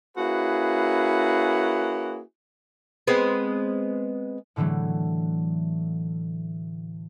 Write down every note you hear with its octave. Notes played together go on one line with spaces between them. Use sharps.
A#3 C#4 E4 F#4 G#4 B4
G#3 B3 C4
A2 D3 E3 F#3 A3